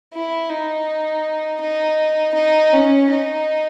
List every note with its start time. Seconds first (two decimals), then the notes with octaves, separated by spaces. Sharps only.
0.14 E4
0.50 D#4
1.61 D#4
2.35 D#4
2.73 C#4
3.10 D#4